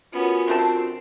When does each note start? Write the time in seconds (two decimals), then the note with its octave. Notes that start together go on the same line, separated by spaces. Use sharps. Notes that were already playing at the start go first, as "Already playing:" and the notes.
0.12 B3 C#4 F4 F#4 A#4
0.47 D3 A3 C4 A5